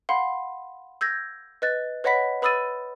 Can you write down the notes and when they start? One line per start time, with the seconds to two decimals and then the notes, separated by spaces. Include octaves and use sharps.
0.09 F5 F#5 B5 C6
1.01 E6 G6 G#6 A#6
1.62 B4 D#5 F#6 A6
2.04 B4 C#5 D#5 F#5 B5 B6
2.42 B4 B5 D#6 E6 A6 D#7